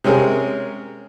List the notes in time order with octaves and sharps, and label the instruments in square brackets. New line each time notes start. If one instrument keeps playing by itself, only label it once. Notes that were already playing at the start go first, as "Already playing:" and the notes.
[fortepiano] C3 G#3 C#4 G#4 A#4